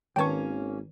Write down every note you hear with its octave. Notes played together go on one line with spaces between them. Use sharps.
G#1 D#3 A#3 C#4 B4 G5 A5 C#6